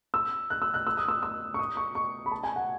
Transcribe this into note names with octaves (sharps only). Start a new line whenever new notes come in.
E6
F#6
E6
F#6
E6
D#6
E6
E6
C#6
D#6
C#6
C#6
B5
A5
G#5
F#5